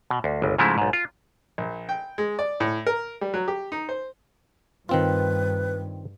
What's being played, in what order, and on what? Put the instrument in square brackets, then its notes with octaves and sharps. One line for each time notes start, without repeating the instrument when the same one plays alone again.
[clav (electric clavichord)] B2
D2
G1 C#2
G#2 C#3 F3 G#3 A3 E4
B1 G#2
F4
[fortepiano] A#1
G5
G#3
D5
A2
A#4
G3
F#3
G4
D#4
C5
[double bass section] G2 [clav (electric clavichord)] D#3 C4 F4 [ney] B4